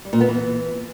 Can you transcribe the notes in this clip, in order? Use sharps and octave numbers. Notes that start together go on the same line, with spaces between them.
G3
A#2
B3
E3